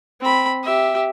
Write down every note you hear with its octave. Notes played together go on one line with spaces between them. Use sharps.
C4 B5
G4 E5